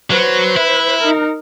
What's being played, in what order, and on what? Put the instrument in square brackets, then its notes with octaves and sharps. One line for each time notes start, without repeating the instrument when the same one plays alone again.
[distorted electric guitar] F#3 [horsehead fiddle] B4 C5
[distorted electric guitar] E4
[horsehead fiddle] D#4 A#4